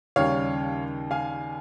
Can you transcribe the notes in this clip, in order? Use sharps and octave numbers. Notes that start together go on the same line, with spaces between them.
D#2 C#3 G3 C#5 F5
F5 G#5